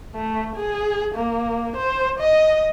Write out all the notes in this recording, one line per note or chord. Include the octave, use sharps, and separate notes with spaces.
A3
G#4
A#3
C5
D#5